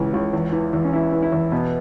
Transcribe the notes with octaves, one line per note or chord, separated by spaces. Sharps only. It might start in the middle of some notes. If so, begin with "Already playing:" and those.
Already playing: C#2 C#3 E3
C#2
E2
E3
E2
C#4
E3 E4
E3
E4
E2
B2 B3